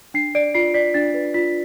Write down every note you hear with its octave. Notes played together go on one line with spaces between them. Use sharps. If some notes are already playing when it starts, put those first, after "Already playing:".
D4 C7
D5 D7
F4 C7
D5 B6
D4 A6
B4
F4 B6